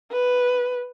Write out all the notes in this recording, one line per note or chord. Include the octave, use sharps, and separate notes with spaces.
B4